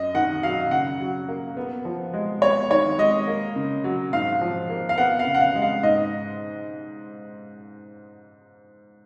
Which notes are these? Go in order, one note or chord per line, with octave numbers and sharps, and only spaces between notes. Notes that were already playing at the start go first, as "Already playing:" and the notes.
Already playing: F#2 D#5
D#3 F#5
F#3 F5
C#3 F#5
F#3
A#3
B3
F3
G#3
B3 C#5
D#3 C#5
G#3 D#5
A#3
C#3
F#3
G#2 F5
F3
A#3
F5
B3 F#5
F5
C#3
F#5
F5
G#3
F5
G#2 D#5